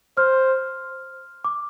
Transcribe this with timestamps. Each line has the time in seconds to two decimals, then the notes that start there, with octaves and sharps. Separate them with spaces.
0.17 C5 F6
1.45 D6